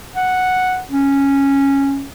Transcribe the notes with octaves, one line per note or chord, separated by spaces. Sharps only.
F#5
C#4